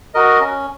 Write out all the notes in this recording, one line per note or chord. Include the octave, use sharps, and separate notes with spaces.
F#4 A#4 D#5
C#4